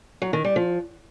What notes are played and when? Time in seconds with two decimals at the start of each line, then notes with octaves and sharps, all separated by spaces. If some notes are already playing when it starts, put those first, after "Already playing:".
0.22 F#3
0.33 D#3
0.44 G3
0.56 F3